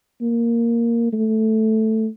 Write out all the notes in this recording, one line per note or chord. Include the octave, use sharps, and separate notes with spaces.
A#3
A3